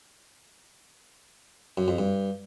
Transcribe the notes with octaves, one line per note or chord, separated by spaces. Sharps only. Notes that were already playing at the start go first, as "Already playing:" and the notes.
F#2
F2
G2